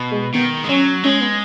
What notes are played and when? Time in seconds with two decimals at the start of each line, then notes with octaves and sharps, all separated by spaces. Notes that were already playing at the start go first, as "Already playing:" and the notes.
Already playing: B2
0.11 G#3
0.34 D#3 B3
0.64 G#3
0.69 F#3 C#4
1.03 G#3 C#4
1.21 B3